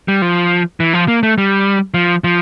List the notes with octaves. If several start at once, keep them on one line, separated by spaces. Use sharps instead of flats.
G3
F3
E3
F3
A#3
A3
G3
F3
F3